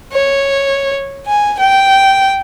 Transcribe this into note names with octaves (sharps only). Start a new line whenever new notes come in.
C#5
G#5
G5